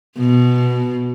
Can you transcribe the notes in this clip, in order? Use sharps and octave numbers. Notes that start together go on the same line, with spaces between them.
B2